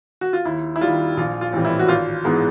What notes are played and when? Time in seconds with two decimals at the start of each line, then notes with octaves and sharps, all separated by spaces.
0.21 F#4
0.33 F4
0.45 D#2 E4
0.76 E4
0.81 D#3 G3 F4
1.17 A#1 F4
1.41 F4
1.53 A2 E3 G3 C4
1.65 E4
1.79 F#4
1.88 G#1 F4
2.24 G#2 E3 G#3 B3